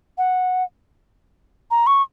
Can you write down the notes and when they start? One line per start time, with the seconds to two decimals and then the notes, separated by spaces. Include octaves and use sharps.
0.18 F#5
1.71 A#5
1.87 C#6